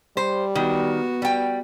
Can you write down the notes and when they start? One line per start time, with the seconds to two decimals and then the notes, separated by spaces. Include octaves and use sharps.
0.17 G3 C5
0.55 D#3 B3 F#4
1.22 G3 G5